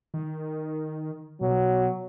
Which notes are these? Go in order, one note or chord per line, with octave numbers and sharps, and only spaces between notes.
D#3
B2 F#3